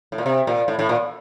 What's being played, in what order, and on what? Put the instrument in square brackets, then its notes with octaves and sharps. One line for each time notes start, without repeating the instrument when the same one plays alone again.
[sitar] A2
A#2
C3
A#2
A2
A2
A#2